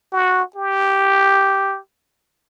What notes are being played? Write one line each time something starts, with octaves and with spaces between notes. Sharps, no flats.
F#4
G4